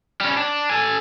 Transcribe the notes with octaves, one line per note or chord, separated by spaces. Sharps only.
G3 C#4
D4
A4 G#5